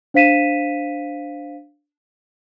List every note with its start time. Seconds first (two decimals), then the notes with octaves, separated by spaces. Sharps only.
0.14 D4 C5 F5 B6 D#7 E7